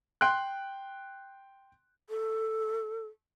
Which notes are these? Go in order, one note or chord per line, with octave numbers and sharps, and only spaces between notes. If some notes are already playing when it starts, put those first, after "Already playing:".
G5 C6 F#6
A4